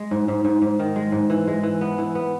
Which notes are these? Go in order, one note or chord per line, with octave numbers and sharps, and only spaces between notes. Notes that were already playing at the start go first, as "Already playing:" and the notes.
Already playing: G#3
G#2
G#2
G#2
G#2
D#3
G#3
G#2
E3
G#3
E3
B3
E3
B3